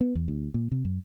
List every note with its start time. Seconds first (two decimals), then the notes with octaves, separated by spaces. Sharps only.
0.01 B3
0.15 E2
0.28 D2
0.54 A#2
0.72 C3
0.85 F#2